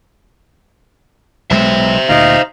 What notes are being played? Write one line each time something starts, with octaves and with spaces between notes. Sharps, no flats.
B1 G#3 C5 E5
D2 A#2 D#4 F5 A#5